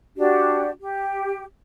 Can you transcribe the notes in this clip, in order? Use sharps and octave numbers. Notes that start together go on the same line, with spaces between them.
D4 F#4 G4
G4